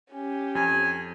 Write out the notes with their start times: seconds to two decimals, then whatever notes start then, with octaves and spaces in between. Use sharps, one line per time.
0.12 C#4 G4
0.55 F2 G#5